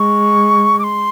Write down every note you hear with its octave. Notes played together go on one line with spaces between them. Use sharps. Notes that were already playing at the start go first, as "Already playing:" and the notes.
Already playing: G#3 C#6
D6
C6